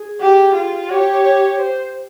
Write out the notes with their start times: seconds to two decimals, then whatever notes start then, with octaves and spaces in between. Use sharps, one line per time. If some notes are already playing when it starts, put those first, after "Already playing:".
Already playing: G#4
0.20 G4
0.56 F4
0.90 G4 C#5
1.23 C#5
1.58 C5